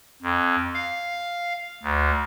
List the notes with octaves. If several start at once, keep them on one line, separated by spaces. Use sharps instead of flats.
F2
F5
D2